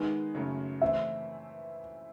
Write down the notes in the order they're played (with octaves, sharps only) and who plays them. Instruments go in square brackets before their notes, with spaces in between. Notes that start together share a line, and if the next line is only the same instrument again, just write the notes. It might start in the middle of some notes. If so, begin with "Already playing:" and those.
Already playing: [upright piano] D#3 G#3 B3 D#4
F#2 C#3 F#3 A3
[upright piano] E3 A3 C4 [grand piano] E5